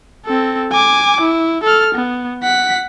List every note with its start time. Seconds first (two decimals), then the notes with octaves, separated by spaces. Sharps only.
0.25 C4 A4
0.72 G#5 D6
1.21 E4
1.63 A4 F6
1.95 B3
2.43 F#5 B6